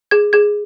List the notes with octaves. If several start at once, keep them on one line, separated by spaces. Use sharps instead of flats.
G#4 G#6
G#4 G#6